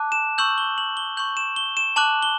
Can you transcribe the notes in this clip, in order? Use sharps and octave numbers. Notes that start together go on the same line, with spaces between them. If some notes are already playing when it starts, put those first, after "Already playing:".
Already playing: A5 D6 F#6
E7
C#6 E6 G6 F#7
G7
F#7
G7
C#6 G6 F#7
E7
G7
E7
A5 D6 F#6 F#7
G7